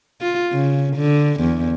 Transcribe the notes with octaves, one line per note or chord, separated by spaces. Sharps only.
F4
C#3
D3
E2